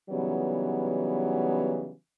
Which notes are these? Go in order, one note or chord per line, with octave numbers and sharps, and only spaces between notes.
C#3 E3 F#3 G3 B3 D#4